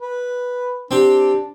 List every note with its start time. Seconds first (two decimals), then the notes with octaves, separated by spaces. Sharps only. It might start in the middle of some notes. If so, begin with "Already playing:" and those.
0.01 B4
0.91 C4 D4 G4